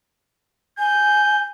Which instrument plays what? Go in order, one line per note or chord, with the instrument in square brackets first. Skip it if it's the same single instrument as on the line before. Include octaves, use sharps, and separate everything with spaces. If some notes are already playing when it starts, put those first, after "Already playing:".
[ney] G#5 [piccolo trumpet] G6